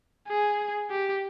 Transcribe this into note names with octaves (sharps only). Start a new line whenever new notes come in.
G#4
G4